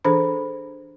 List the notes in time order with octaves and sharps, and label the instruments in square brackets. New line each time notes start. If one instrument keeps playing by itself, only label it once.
[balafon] E3 D4 G#4 A4 C5 B5